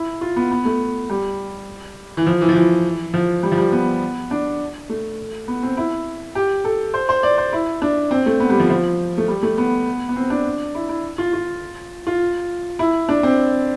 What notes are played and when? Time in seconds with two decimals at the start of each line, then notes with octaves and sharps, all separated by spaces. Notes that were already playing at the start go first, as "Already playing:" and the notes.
Already playing: E4
0.21 F4
0.36 B3
0.51 B3
0.65 A3
1.10 G3
2.17 E3
2.27 F3
2.41 E3
2.49 F3
2.55 E3
3.14 F3
3.43 G3
3.52 F3
3.58 G3
3.72 B3
4.31 D4
4.89 A3
5.48 B3
5.63 C4
5.77 E4
6.35 G4
6.65 A4
6.94 C5
7.09 C5
7.23 D5
7.38 C5
7.53 E4
7.82 D4
8.11 C4
8.26 A3
8.40 B3
8.50 G3
8.59 F3
8.70 F3
9.18 A3
9.28 G3
9.43 A3
9.58 B3
10.09 B3
10.16 C4
10.30 D4
10.75 E4
10.89 E4
11.18 F4
11.33 F4
12.07 F4
12.79 E4
13.09 D4
13.23 C4